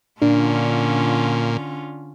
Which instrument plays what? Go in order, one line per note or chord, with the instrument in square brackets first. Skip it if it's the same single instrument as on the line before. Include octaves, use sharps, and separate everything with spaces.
[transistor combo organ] A#2 [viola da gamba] D3 C#4 F4 [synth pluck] D4